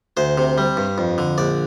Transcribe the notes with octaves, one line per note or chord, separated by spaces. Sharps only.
D2 C5
C3
G3
G2
F2
D3
A#1 D5